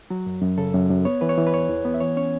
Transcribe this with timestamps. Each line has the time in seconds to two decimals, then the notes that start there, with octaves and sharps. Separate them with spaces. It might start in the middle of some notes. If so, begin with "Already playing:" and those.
0.10 F#3 F#4
0.26 F#2
0.42 F#2
0.58 C#3 A4
0.74 F#2
0.90 F#2
1.05 B3 C#5
1.21 E3 B4
1.29 C#5
1.37 E3
1.47 B4
1.54 E2 C#5
1.69 E2
1.85 B3
1.94 E5
2.00 E3 C#5
2.17 C#4 C#5